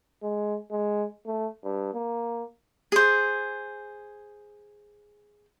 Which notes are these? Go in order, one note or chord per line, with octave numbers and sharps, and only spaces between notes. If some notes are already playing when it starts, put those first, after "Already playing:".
G#3
G#3
A3
G2
A#3
G#4 C5